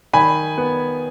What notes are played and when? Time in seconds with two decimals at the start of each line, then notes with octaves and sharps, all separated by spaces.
0.13 D#3 G#5 B5
0.58 B3